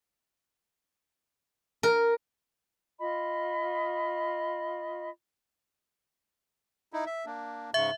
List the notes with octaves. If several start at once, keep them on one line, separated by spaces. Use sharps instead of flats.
A#4
F4 D#5 B5
D#4 E4
E5
A#3 D4
G#2 C#3 E5 C#6